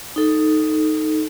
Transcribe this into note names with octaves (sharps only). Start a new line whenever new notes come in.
D#4 A4